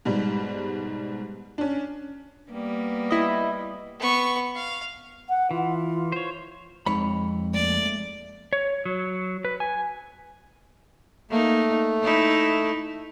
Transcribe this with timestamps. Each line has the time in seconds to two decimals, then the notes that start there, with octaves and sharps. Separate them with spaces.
0.05 G#2 B2 G3
1.58 C#4 D4
2.52 G3 A#3 B3
3.11 E4 D#5
4.00 B3 C#6
4.55 F5
5.29 F#5
5.51 E3 F4
6.12 C5 C#5
6.86 F2 G#3 C4 D#4 C#5 B5
7.54 A3 A#3 D5
8.53 C#5
8.85 F#3
9.45 B4
9.60 G#5
11.30 A3 A#3 D#4
12.02 D#4 E4